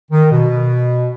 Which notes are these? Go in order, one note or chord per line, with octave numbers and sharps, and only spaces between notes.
D#3
B2